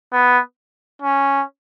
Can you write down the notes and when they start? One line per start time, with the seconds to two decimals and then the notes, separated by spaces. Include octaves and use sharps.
0.12 B3
1.02 C#4